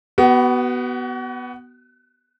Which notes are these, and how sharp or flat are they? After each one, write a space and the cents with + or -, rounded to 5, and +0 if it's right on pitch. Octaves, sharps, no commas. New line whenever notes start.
B3 +0 F#4 +35